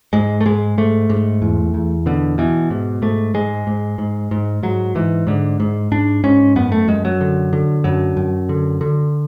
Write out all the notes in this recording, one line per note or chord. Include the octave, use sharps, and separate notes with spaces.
G#2 G#3
A3
G#2 G#3
G#2 A3
G#2
E2
E2
B2 D3
B2 E3
G#2
G#2 A3
G#2 G#3
G#2
G#2
G#2
G#2 F#3
G#2 E3
G#2 D3
G#2
G#2 D4
G#2 C#4
F#2 B3
A3
F#2 G#3
F#3
D3
D3
F#2 F#3
F#2
D3
D3